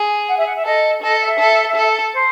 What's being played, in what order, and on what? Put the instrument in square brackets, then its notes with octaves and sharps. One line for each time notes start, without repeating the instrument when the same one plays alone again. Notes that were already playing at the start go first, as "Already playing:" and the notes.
Already playing: [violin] G#4
[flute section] F#5
E5
F#5
E5
[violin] A4 [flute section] D#5
[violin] A4 [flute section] D#5
[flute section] E5
[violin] A4
A4
[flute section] C5